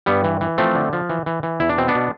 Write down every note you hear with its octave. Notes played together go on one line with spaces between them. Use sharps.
G2 G3 B3
E3
E3
F3 A3 C4
D3
F3
E3
E3
E3
E2 E4
D4
B2 C4
B3 D4
B2